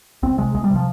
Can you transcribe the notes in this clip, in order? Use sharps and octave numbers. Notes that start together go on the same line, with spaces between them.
C2 C4
C3 G#3
C2 G#3
G3
C3
F3